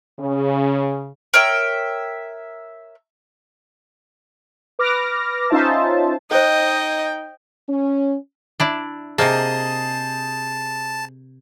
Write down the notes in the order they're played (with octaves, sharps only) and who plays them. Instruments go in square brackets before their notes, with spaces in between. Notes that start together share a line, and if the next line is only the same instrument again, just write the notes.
[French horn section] C#3
[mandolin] A#4 C#5 E5 G5
[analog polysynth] B4 D6 F6 A#6
C#4 D#4 F4 C5 E5 A5
[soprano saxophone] D#4 [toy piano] A4 C5 [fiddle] D#5 [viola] G5
[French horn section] C#4
[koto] D4 E4 D5
[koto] C3 A#3 [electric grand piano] G#4 C5 D#5 [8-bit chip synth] A5